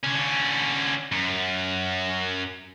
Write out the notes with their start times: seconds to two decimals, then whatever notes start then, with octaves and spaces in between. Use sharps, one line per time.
0.04 D3 C#4
1.12 F#2